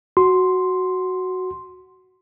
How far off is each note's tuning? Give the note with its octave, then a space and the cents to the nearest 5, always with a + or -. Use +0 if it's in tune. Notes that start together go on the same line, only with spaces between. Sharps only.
F#4 +0 C6 +0